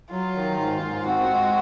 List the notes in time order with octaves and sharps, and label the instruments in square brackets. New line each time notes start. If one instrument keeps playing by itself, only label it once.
[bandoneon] F#3 [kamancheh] F4
[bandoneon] D#3
G#2
G#2
[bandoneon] C4 [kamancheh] F#4
[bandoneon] G#3